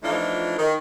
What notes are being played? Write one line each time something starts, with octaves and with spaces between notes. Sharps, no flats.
E3 F3 A3 D4 D#4 F4
D#3